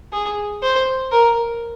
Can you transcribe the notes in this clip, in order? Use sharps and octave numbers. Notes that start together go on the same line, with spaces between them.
G#4
C5
A#4